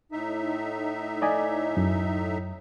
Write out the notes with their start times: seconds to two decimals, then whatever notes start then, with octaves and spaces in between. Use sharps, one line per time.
0.12 A2 D#4 E5
1.22 D5 D#5 G#5
1.77 F#2